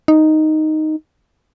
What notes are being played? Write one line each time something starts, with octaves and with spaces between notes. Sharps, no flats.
D#4